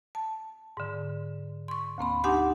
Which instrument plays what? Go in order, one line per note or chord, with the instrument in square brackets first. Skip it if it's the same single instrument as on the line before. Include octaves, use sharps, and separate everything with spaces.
[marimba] A5
G#2 D3
C6 C#6
D2 A#3 C4 B5
D4 D#4 G4 F#5 G#5 C6